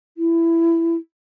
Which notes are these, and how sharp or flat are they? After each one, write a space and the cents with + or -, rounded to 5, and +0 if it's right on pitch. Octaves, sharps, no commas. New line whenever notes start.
E4 +15